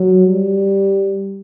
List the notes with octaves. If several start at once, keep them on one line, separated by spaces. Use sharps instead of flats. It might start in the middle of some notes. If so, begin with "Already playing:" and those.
Already playing: F#3
G3